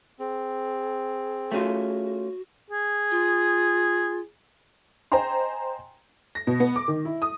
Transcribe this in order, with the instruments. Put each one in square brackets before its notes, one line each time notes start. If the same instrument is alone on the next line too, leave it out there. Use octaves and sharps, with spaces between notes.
[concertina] C4 [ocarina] G#4
[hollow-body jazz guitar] A3 C#4 F4 [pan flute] F#4
[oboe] G#4
[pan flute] F4
[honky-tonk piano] C5 D#5 G5 G#5 A#5 C6
A#6
B2
B3
D6
D#3
E4
D#6